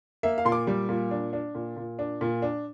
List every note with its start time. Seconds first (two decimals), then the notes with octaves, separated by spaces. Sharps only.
0.23 A#3 E5
0.38 F5
0.45 A#2 C6
0.52 D6
0.67 G3
0.89 A#2
1.11 D4
1.33 D4
1.55 A#2
1.76 A#2
1.99 D4
2.21 A#2
2.42 D4